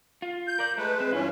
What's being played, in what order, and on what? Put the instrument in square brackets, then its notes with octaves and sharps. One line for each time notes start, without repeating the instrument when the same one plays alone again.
[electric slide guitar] F4
[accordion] G6
[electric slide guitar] A#4 D5
[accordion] G#3 B4 [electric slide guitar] A3
[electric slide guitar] C4
[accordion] G2 E3 C#4 [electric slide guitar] E4 F4